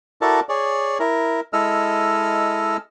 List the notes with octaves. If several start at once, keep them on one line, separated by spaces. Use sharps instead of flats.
E4 F#4 A4 A#4 D5 A5
G#4 C#5 D5
E4 A#4
G#3 E4 A4 D#5 E6 F6